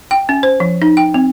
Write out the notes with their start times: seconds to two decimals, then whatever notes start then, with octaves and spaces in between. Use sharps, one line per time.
0.11 G5
0.29 C#4
0.43 C5
0.60 F3
0.82 D#4
0.97 G5
1.14 C4